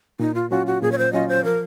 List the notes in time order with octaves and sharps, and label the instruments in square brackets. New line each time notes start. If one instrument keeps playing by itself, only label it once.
[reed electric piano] A#2 [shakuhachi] D#4
[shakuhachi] F4
[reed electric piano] F#3 C#4 F4 [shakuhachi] F#4
[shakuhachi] F#4
[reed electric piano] A#2 [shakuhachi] G#4
[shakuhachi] C#5
C5
[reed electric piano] F#3 C#4 F4 [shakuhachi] D#5
[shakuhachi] C5
[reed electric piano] F3 [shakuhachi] A#4